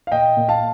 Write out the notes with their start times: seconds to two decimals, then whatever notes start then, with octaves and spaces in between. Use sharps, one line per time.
0.07 F5
0.12 A#2 D#5 G5
0.37 A#2
0.49 F5 A5